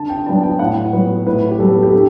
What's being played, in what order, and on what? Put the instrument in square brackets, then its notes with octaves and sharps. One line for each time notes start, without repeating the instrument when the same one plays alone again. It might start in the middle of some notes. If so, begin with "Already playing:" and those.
Already playing: [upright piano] D3 A5
G5
F#3 B3 D4 A5
G5
A2 F#5
F#3 B3 B4
A2 B4
G4
F#3 B3 A4
G4
D3 A4